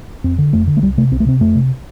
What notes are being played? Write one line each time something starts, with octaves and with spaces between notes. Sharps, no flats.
F2 C4
D3
F2 A3
D3
A3
C2 G3
C3 A3
C2 C4
A3
C3 C4
F2 A3
C3